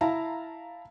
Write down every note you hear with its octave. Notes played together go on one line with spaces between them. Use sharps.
E4 F5 A5 A#5